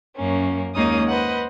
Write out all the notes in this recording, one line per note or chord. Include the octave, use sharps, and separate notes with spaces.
F#2 A#3 C#4
D#2 G#3 A#3 C#4 D#4 D#6
B4 C5 D#5 F#5